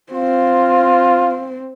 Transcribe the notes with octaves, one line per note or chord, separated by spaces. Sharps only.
C4 F4